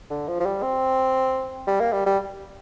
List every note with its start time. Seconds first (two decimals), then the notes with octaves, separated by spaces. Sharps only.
0.11 D3
0.28 F3
0.40 F3
0.45 G3
0.62 C4
1.67 G3
1.80 A#3
1.93 G3
2.06 G3